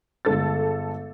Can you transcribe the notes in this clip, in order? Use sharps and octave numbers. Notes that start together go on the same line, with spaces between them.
G1 G#3 A4 E6 A6